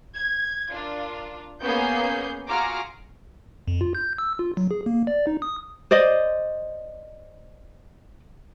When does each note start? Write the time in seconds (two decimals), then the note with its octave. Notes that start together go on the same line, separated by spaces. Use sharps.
0.15 G#6
0.70 D4 F4 A#4
1.63 A#3 B3 C#4 G#4 G6 C7
2.49 F4 F#4 G#4 A#5 D6 F6
3.68 F2
3.81 F4
3.95 G6
4.18 E6
4.39 F4
4.57 F#3
4.71 G#4
4.86 A#3
5.07 D5
5.27 D#4
5.42 D#6
5.91 C5 D5 D#5